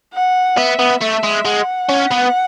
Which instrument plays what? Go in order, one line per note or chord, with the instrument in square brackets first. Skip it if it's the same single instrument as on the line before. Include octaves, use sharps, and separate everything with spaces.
[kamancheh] F#5
[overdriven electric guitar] B3 [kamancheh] E5
[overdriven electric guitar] B3
[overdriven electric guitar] A3 [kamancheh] E5
[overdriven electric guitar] G#3
[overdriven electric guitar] G#3 [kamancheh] F#5
[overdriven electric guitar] C#4
B3